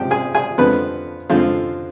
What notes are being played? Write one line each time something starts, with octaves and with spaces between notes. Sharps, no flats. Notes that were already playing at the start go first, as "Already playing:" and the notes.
Already playing: C3 F3 G#3 G4 G5
G#4 G#5
G#4 G#5
F2 D3 F3 G#3 B3 B4
F2 D3 F3 G#3 F4